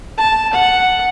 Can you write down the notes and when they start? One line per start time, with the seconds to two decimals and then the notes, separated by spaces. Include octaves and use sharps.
0.18 A5
0.53 F#5